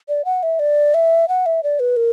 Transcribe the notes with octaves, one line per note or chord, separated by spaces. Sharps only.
D5
F#5
E5
D5
E5
F#5
E5
D5
B4
A#4